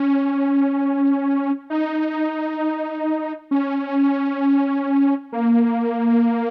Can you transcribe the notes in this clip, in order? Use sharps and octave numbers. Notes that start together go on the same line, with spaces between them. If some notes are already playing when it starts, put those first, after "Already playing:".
Already playing: C#4
D#4
C#4
A#3